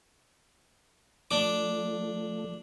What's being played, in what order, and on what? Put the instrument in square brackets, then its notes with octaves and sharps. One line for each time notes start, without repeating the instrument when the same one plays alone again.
[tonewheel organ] F3 A3 [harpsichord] D4 D6